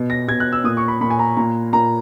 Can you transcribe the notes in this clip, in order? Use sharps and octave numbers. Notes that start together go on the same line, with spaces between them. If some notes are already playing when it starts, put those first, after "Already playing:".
Already playing: B2
A#6
B2 G#6
F#6
E6
A#2 D#6
C#6
B5
A#2 B5
G#5
A#5
A#2 A#5
A#2 A#5